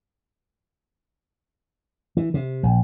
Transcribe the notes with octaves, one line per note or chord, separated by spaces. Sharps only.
E3
C3
A#1